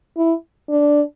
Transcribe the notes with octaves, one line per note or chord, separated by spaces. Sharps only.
E4
D4